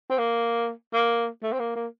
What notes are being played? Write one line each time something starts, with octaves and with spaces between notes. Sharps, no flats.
C4
A#3
A#3
A3
C4
A#3
A#3